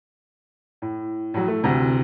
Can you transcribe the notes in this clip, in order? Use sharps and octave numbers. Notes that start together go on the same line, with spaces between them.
A2
A2 F#3
A3
D2 C3 E3